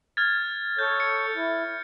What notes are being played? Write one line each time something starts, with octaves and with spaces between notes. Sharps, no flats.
F6 G#6 A6
A4 C#5 G6
C#7
E4